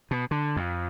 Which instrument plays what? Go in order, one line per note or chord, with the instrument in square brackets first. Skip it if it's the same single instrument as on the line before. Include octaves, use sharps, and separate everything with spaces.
[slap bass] B2
D3
F2